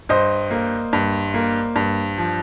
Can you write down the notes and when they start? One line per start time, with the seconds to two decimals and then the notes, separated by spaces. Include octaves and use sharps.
0.09 G2 C5 D#5
0.51 A#3
0.93 G2
1.34 A#3
1.76 G2
2.18 F3